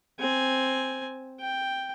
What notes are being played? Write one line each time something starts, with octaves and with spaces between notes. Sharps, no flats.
C4 G#5
G5